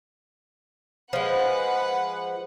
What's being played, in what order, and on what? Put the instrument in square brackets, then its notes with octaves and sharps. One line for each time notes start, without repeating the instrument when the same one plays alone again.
[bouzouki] F3 G#3 [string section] B4 F#5